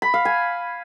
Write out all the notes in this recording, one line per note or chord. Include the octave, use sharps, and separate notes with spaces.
B5
F5
G#5